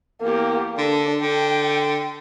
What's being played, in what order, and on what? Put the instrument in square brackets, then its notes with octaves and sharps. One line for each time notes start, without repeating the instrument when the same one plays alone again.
[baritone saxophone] E2 [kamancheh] A#3 G4
[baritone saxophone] D3 [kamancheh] D4
[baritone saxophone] D3 [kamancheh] G5